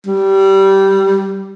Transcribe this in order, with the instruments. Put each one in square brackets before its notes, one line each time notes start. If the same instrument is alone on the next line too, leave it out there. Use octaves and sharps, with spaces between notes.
[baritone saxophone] G3